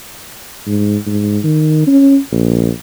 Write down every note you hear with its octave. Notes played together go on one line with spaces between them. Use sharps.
G#2
G#2
D#3
C#4
A#1